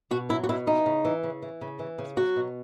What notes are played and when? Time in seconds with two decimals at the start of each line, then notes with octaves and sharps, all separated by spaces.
0.11 B2 F#4
0.29 F#3 E4
0.44 F#4
0.49 B2 E4
0.67 E3 D#4
0.86 C#3
1.05 E3
1.23 C#3
1.42 E3
1.61 C#3
1.79 E3
1.98 C#3
2.17 F#3 F#4
2.36 B2